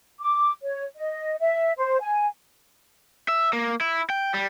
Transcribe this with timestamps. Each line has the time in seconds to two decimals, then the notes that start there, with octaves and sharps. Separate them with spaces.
0.20 D6
0.62 C#5
0.96 D#5
1.39 E5
1.78 C5
2.01 G#5
3.29 E5
3.53 A#3
3.81 E4
4.10 G5
4.34 G3